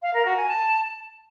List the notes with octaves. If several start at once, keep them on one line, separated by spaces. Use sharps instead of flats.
F5
A#4
F#4
G#5
A5